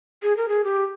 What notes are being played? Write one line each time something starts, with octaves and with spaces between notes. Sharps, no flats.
G#4
A#4
G#4
G4